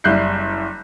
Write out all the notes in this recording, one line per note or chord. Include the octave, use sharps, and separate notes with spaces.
F#1 G3 E5 F#6 G6 C7